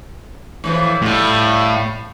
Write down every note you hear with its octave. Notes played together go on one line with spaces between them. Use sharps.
A2 E3 F3
A2 G3 F4